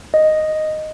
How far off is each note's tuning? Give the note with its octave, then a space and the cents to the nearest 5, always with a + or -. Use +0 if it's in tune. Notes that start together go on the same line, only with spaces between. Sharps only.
D#5 -5